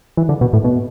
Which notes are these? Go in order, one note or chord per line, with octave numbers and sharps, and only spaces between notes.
E3
D3
B2
A2
B2